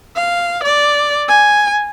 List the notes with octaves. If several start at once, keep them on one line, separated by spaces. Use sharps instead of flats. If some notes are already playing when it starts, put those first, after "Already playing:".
F5
D5
G#5